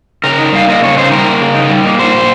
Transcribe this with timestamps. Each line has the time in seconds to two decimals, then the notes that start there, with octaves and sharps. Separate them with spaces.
0.24 C#3 A#4
0.38 D#4
0.53 G3 F5
0.68 A#3 D#5
0.82 C#3 C#5
0.97 D#4 C5
1.12 G3 A#4
1.25 A#3
1.40 C#3
1.54 D#4
1.70 G3
1.85 A#3
1.99 A#2 C5
2.14 A#2